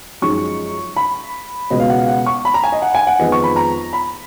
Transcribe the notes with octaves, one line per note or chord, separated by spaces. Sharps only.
F#2 F3 G#3 D#4 C#6
B5
C#2 B2 G#3 B3 D#5
F5
F#5
F5
F#5
C#6
B5
A#5
G#5
D#5
F#5
G#5
F#5
F2 D#3 G#3 B3 D#5
C#6
B5
A#5
B5